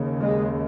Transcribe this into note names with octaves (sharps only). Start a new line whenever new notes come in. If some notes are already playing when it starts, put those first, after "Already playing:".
Already playing: D#2 C#3
G#3